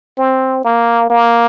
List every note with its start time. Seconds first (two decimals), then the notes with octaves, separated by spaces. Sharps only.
0.18 C4
0.65 A#3
1.10 A#3